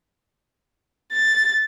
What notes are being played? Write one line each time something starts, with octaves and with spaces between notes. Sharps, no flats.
A6